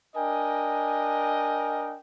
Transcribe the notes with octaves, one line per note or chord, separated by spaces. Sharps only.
D4 A#4 D#5 G5 G#5